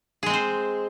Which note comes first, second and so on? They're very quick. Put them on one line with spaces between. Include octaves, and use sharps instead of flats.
G#4 G#3 C4 C5